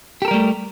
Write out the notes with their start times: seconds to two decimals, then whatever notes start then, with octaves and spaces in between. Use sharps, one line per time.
0.22 G4
0.25 A4
0.28 A#4
0.31 G3
0.34 A3